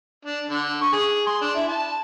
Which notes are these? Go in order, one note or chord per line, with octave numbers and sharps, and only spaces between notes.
D4
D3
C#6
G#4
C6
D4
E4
A5